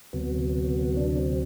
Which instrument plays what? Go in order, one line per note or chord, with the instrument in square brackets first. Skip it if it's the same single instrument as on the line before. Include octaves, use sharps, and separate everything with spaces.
[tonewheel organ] D2 C3 F#3 B3
D4
C4